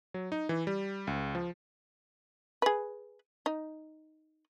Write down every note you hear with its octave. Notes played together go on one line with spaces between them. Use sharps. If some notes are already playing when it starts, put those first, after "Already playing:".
F#3
D#4
E3
G3
C#2
F3
G#4 B4
D#4